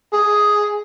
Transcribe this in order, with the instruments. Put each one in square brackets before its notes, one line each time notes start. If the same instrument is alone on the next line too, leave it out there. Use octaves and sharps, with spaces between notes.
[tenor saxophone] G#4